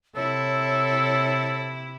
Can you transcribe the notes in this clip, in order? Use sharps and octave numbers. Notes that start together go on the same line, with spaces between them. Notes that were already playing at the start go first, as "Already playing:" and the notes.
C3 E4 A4 C#5